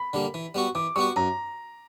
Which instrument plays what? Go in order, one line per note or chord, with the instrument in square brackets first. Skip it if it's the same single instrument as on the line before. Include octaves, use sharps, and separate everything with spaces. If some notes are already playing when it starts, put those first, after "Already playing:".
Already playing: [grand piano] B5
[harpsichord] D3 G3 A#3
E3
G3 B3 F#4
[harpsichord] E3 [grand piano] D6
[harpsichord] G3 B3 F#4 [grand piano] C#6
[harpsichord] F#2 [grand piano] A#5